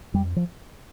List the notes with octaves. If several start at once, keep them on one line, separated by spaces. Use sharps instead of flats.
F2 G3
F3